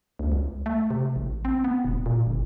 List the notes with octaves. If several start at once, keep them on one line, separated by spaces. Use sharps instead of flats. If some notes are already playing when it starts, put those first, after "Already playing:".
D2
C#2
A3
C3
A1
C4
B3
D#1
A#2
G1